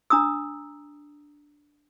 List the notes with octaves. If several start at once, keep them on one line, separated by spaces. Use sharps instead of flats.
D4 A#5 D#6 E6